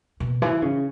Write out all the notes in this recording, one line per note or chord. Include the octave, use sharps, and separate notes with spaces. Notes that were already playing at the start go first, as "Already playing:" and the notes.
B2
E3
C#3